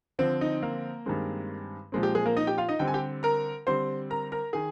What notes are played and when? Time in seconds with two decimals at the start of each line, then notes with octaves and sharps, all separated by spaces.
0.19 D3 F3 C4 C5
0.41 D#4 D#5
0.62 A#3 A#4
1.06 G2 D#3 G#3 C4
1.92 A#2 F3 G#3 C4
2.03 G4
2.15 G#3 G#4
2.26 A#3 A#4
2.37 D#4 D#5
2.47 G4 G5
2.58 F4 F5
2.69 D#4 D#5
2.79 D3 G3 C4 G5
2.88 G#5
2.94 G4 G5
3.23 A#4 A#5
3.67 D3 G3 C4 C5 C6
4.10 A#4 A#5
4.32 A#4 A#5
4.53 D#3 G#4 G#5